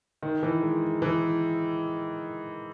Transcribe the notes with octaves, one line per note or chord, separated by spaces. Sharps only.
D#3
E3
G#3
E3